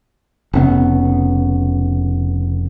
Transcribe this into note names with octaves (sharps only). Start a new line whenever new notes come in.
F1 C#3 B3